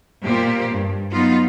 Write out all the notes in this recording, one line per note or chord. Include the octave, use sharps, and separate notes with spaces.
A#2 A#3 G4 C5
G2
F#3 B3 D#4 F4